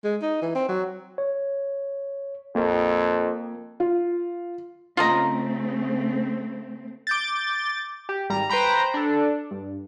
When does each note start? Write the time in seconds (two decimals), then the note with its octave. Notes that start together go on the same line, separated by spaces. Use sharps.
0.04 G#3
0.22 D#4
0.42 E3
0.55 C4
0.69 F#3
1.18 C#5
2.55 F2 A#3 A#4
3.80 F4
4.97 C#3 A3 C4 F4 D#5 A#5
7.07 D6 G6 A6
8.09 G4
8.29 G#1 G3 A#5
8.50 B4 C5 G5 A#5 B5
8.94 D4 A4
9.51 G2